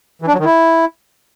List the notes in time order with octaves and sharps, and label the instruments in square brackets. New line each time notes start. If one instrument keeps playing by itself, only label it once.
[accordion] E3
D4
F#3
D#3
E4